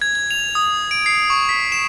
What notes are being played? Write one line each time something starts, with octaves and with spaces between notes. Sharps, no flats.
G#6
G#6
F7
D#6
D7
C7
C#6
B6
E7